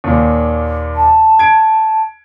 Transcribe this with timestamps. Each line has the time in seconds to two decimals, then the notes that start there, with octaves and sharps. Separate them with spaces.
0.04 D#2 A#2
0.95 A5
1.39 G#6 D7